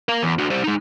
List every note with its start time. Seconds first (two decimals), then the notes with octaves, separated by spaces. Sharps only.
0.09 A#4 F5
0.22 E2
0.39 D4 F#4
0.50 G3 C5
0.64 G#3 D#4